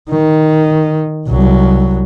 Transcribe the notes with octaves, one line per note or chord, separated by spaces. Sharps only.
D#3
C2 F#3